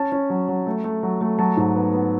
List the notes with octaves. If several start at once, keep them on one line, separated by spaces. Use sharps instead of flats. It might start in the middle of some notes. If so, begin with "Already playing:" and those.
Already playing: C#4 A5
C#4
F#3
F#3
A3
A3
F#3
A3
F#3 A5
G#2
B3
B3